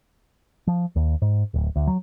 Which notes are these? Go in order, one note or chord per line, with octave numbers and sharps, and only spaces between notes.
F3
D#2
G#2
D1
D2
F#3